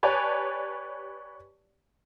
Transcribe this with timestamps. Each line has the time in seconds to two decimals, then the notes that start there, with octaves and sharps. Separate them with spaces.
0.03 G4 B4 C#5 D5 G#5 A5